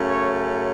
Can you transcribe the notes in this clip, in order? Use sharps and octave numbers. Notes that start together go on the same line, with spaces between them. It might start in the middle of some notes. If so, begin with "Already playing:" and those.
Already playing: F#2 C#3 A3 C#4
C#5